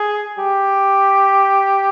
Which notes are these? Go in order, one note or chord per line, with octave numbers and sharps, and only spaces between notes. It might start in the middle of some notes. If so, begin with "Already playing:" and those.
Already playing: G#4
G4